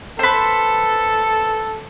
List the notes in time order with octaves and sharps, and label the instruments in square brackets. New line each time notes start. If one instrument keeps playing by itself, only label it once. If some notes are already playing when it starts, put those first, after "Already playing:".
[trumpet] A4 [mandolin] B4 C5